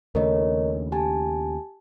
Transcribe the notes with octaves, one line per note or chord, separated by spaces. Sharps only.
D#2 C#3 A3 A#4 C#5 D#5
G4 G#5 A5